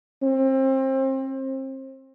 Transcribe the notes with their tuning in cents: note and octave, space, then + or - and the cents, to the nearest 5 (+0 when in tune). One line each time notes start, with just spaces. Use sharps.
C4 +30